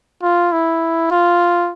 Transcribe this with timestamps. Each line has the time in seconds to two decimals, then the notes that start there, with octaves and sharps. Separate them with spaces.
0.23 F4
0.52 E4
1.11 F4